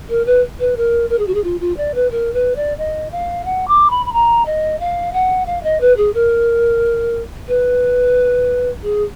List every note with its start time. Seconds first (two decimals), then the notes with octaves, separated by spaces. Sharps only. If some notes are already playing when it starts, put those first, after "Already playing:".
0.09 A#4
0.26 B4
0.59 B4
0.76 A#4
1.09 A#4
1.18 G#4
1.27 F#4
1.34 G#4
1.43 F4
1.60 F4
1.77 D5
1.94 B4
2.11 A#4
2.33 B4
2.55 D5
2.77 D#5
3.12 F5
3.44 F#5
3.67 D6
3.90 B5
4.05 B5
4.12 A#5
4.45 D#5
4.79 F5
5.13 F#5
5.46 F5
5.63 D#5
5.80 B4
5.97 G#4
6.13 A#4
7.48 B4
8.82 G#4